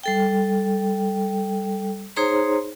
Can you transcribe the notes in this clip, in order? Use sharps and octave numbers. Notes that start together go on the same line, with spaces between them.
G3 A4 G5
D#4 G#4 C5 C#5 A#5 C6